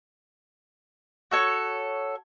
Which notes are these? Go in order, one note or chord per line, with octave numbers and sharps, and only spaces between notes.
F#4 A4 C#5